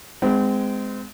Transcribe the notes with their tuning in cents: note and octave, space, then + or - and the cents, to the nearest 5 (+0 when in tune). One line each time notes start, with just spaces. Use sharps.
G#3 +0 C4 -30